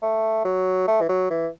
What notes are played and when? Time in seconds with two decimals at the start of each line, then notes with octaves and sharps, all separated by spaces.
0.02 A3
0.45 F#3
0.87 A3
1.01 E3
1.09 F#3
1.30 E3